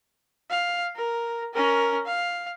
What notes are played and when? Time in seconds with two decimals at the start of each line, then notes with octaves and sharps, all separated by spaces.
0.50 F5
0.96 A#4
1.54 C#4 A#4
2.06 F5